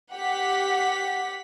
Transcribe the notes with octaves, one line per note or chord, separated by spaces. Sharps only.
G4 F#5 B6